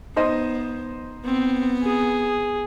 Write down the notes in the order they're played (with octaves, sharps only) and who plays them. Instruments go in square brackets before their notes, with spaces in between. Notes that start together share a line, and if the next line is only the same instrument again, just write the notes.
[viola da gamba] B3 [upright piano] D#4 C5 D#5
[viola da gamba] B3 [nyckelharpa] C4
[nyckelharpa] G#4